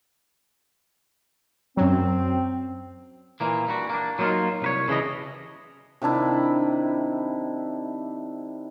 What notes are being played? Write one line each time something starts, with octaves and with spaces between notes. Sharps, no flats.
F#2 F#3 C4
A#2 E3 A#3
G3 D4 F#4
A#3 D4
F#3 G3 A#3 B3 D#4 F4
C2 B4 C#5
C#3 E3 D4 D#5
C3 D#3 D4 E4